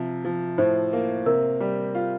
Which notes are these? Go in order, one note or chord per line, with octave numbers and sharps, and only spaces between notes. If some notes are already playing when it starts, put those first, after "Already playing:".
Already playing: C3 F3
F3
A2 C5
A#3
C3 A#4
G3
F4